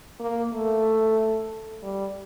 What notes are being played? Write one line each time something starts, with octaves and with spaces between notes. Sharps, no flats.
A#3
A3
G3